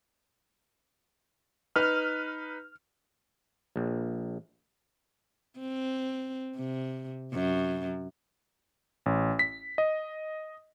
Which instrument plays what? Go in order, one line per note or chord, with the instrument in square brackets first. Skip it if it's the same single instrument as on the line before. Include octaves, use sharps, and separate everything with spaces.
[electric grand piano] D#4 B4 [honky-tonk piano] F6
[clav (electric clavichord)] A#1
[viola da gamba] C4
C3
F#2
[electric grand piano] A1
B6
D#5